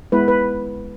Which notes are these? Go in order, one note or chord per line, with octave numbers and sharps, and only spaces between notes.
G#3 B3 E4 B4
B4